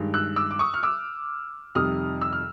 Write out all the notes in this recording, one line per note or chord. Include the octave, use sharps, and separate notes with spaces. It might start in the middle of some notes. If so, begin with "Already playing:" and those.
Already playing: G2 D#3 G#3
E6 F#6
D6 E6
D6
C#6 D#6
F6
D6 E6
F2 C3 D#3 G3 D#6 F6
E6
F6